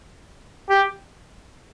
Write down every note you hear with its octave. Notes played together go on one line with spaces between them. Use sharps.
G4